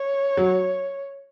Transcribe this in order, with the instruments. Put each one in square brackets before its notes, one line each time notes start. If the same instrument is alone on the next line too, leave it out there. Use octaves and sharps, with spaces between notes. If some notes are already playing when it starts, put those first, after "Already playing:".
Already playing: [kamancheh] C#5
[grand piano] F#3